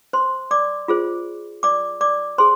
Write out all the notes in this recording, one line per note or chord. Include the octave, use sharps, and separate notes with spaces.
C5 C6
D5 D6
F4 G#4 C5
D5 D6
D5 D6
G#4 C5 C6